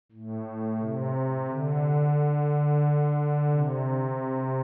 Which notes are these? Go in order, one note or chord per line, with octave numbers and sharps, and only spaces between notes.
A2
C3
D3
C3